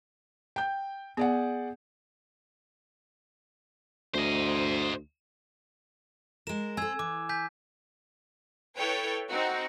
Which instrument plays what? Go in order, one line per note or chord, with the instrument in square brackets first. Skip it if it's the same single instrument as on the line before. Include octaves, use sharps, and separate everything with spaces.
[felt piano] G5 G6
[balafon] B3 [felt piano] G#4 D5 F#5
[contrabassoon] D2 [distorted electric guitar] C5 D#5
[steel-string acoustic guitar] G#3 A#4 [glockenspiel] E7
[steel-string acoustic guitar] C4 A4 [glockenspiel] G#5 E6 G#6
[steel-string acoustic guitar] E3 [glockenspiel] D6
[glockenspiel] G#5 G6 B6
[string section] E4 A4 B4 C#5 G5
C4 D#4 F#4